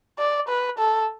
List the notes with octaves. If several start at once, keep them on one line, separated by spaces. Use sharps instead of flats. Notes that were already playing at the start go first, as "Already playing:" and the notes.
D5
B4
A4